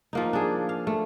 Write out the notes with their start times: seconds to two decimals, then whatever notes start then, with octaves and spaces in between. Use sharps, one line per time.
0.13 F3 A#3 D#4
0.33 D4 G#4
0.69 F5
0.87 A3